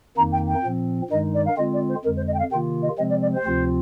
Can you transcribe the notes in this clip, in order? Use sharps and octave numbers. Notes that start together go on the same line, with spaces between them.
F2 D#3 A#3 D#4 A#5
G5
G5
A#2 F3 C4
G2 D#3 G#3 D#4 D#5
D5
F5
D3 G#3 C4 F4 D#5
D5
C5
F2 D3 G#3 A#4
C5
D#5
G5
F5
C3 D#3 A#3 F4 G5
D#5
C3 F3 G#3 C4 D#5
D5
D5
C5
D2 C3 F3 C4 F4